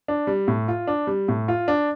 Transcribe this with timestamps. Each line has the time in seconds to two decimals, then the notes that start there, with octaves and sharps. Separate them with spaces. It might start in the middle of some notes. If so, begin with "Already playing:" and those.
0.08 D4
0.27 G3
0.48 A2
0.68 F4
0.87 D4
1.07 G3
1.28 A2
1.48 F4
1.68 D4